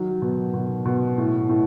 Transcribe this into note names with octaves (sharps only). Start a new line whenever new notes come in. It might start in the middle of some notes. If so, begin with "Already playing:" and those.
Already playing: D#3 F#3
B2
B2
B2
A2
A2